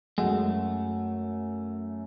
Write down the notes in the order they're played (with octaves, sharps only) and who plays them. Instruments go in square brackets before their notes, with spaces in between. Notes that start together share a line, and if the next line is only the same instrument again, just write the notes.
[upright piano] F#2 [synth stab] G#3 [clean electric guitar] A3 [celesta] F#5